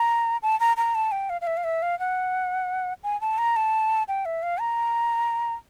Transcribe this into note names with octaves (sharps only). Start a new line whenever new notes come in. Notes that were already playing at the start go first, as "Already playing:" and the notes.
Already playing: A#5
A5
A#5
A#5
A5
G5
F5
F5
E5
F5
E5
F5
F#5
G#5
A5
A#5
A5
G5
E5
F5
A#5